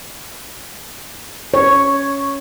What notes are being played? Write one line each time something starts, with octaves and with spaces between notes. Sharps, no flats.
C#5